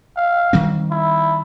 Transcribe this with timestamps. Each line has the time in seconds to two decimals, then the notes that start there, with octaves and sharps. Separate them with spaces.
0.17 F5
0.53 D#3 G3 C4
0.91 E4